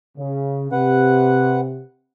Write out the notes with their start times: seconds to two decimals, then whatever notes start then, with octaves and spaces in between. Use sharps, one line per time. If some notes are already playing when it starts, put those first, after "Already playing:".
0.17 C#3
0.72 C3 B4 F#5